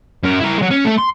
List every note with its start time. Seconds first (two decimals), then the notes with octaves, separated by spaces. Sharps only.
0.24 F#2 A#4
0.40 E4 A#4
0.58 F#3 G#3
0.71 C#4
0.85 A3
0.99 C6